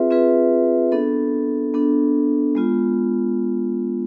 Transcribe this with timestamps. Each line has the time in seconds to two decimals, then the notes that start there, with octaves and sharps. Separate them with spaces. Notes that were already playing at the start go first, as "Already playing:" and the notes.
Already playing: C4 F4 G#4 B4 E5
0.11 C4 F4 G#4 B4 E5
0.92 B3 D4 A4
1.74 B3 D4 A4
2.55 G#3 B3 F4